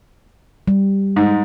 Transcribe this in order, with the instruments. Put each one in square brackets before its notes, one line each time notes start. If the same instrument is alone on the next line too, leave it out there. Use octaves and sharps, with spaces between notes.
[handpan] G3
[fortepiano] G#2